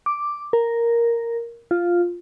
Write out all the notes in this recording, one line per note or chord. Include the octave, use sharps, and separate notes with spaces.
D6
A#4
F4